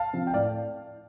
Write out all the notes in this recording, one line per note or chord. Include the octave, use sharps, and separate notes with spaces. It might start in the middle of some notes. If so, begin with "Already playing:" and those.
Already playing: F5 A5
F3 C4
G5
A2 D5 F5